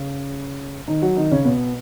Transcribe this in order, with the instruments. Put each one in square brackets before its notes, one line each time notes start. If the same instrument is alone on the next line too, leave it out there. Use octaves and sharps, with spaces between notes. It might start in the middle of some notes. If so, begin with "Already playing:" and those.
Already playing: [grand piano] C#3 C#4
D#3 D#4
F#3 F#4
D#3 D#4
C#3 C#4
B2 B3